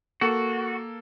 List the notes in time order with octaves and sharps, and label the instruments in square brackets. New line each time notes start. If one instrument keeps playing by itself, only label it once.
[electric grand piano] A#3 A4 [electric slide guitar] F#4